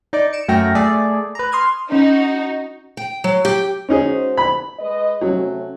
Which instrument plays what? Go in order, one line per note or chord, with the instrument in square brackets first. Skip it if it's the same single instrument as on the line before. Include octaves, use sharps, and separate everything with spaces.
[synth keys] D#4 D5 D6
C#7 D7 E7
F#2 A3 F#4 G5 F6 A#6
A3 G#4 D5 E5
B4 A#5
C6 D#6 F6 G#6
[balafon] C#4 [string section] D#4 F#4
[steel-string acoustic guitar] G5
F#3
G4
[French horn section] G#3 F#4 C5 [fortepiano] C#4 D#4 G#4
[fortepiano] B5
[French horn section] G#3 B4 D#5
[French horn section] C3 A3 C#4 [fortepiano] F#3